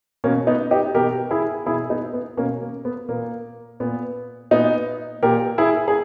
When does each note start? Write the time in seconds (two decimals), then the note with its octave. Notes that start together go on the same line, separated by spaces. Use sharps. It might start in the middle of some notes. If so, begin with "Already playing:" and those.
0.24 B2 A#3 C#4
0.47 B3 D#4
0.71 D#4 G4
0.95 B2 G4 A#4
1.31 E4 G#4
1.66 B2 E4 G#4
1.90 B3 D#4
2.13 B3
2.37 B2 A#3 C#4
2.61 A#3
2.85 B3
3.08 A#2 A#3
3.80 A#2 B3
4.51 A#2 B3 D#4
5.23 A#2 G4 A#4
5.58 E4 G#4
5.88 G#4